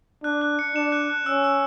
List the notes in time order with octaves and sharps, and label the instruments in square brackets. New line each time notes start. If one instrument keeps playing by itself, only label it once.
[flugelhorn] D4 [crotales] F#6
[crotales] F#6
C#7
[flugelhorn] D4 [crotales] E7
[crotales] F#6
F#6
[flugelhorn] C#4 [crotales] E6
[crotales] E6